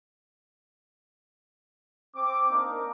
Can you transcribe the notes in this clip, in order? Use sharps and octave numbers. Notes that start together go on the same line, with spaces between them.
C4 D6
A#3 D4 D#4 A#4